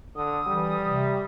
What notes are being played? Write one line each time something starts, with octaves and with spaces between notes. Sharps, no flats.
D3 D#6
E3 G3
C3